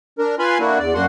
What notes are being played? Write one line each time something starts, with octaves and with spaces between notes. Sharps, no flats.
D4 A#4
F4 B4 F5 G#5 B5 C6
D3 A#3 D4 E4 F#4
E2 D5
F#2 A#3 D4 F#4 F#5 C6